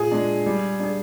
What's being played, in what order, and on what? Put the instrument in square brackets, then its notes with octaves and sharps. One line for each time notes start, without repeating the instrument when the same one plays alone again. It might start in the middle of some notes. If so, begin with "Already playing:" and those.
Already playing: [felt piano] A#2 [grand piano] G#4
[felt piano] G#3 D4
G3
D4 G#4